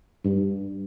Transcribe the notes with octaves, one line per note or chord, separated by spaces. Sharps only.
G2